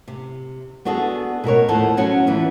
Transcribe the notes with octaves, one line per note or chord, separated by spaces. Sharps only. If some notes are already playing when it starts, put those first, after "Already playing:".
C3
B3 D4 F#4 G#4 A4
B2 F#4 A#4 C#5
D#2 A2 F3 A4 C5 F#5
F#3 B3 C#4 F#4 F#5
F2 D3 E3 A3 C#4